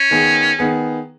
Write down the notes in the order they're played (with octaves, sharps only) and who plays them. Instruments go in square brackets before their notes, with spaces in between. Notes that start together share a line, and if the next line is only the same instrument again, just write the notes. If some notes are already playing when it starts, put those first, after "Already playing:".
Already playing: [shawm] C#4
[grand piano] D#3 B3 G#4
D#3 B3 G#4